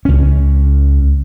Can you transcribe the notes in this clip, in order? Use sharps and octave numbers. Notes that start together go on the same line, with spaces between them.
C#2 C#4